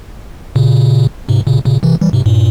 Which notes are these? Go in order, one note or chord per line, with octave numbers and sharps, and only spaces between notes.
A#2 C#3
G#2 C3
A#2 C#3
A#2 C#3
C3 E3
E3 G3
G#2 C3
G2 A#2